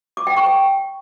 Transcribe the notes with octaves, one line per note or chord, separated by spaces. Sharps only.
D6
G5
C#6
G5